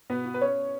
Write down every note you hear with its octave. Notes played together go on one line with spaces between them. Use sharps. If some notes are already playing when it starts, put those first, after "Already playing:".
B2 B3 B4
B2
B4
C#4 C#5